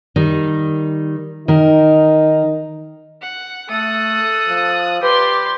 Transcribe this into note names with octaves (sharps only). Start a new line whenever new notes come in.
D#3 G3 D#4
D#3 D#4 A#4
F#5
A3 A4 D#6 F#6
F3
G4 B4 D5 C6